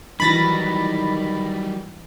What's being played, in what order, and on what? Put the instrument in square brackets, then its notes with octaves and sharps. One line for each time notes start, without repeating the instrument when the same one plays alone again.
[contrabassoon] D#3 [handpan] E3 D#4 [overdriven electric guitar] F#3 G3 [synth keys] B5 A6 A#6